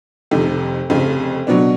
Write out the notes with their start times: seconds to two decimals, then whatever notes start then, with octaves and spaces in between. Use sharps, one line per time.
0.31 F1 F2 C3 D#3
0.90 F1 F2 C#3
1.47 B2 F#3 B3 D4